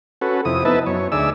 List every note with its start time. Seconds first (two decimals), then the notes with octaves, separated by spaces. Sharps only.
0.22 C#4 F#4 A4 B4
0.45 F2 C3 E4 D#6
0.65 B3 D#4 E4 B4 E5 A5
0.86 F#2 C#5
1.12 D2 D#4 G#4 D5 E5 E6